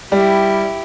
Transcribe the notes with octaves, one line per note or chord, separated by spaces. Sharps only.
G3 E4 G4